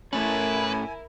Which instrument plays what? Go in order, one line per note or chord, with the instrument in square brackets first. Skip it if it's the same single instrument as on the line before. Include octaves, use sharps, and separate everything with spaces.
[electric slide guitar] A2 A3 C#4 [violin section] E4 A#4 [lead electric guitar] B4 [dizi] G#5